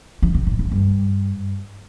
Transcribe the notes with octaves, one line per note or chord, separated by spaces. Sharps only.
F3
C3
A2
F2
G2